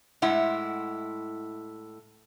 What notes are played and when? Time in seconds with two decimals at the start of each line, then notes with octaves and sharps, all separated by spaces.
0.22 A2 G#3 E4 F#5